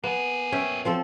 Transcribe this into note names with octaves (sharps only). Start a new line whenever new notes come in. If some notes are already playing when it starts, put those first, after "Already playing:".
A#3 B3 G#4
C#4 E5 G5
F3 C4 A4